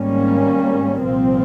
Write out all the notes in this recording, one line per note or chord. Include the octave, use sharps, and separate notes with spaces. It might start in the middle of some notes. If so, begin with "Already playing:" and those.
Already playing: G#1 G#2 G3 A#3 C#4
C2 A#2 F3 C4